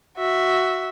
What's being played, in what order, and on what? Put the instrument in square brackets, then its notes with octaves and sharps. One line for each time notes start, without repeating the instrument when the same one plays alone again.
[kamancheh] F#4 E5